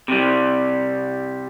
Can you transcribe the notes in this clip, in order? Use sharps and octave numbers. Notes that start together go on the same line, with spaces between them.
C3 G3